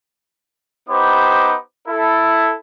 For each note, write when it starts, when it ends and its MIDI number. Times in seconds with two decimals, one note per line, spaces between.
0.89 1.56 59
0.89 1.56 63
0.89 1.56 67
0.89 1.56 72
0.89 1.56 83
0.89 1.56 86
1.88 2.54 64
1.88 2.54 69